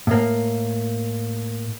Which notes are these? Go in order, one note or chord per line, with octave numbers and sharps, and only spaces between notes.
A2 A#3